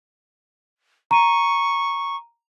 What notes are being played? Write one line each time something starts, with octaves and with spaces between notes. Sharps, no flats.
A#5 C#6 D#7